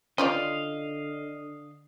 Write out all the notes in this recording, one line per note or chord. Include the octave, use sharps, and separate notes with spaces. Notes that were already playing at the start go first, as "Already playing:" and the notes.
D3 C#4 F4 D5 D#5 F5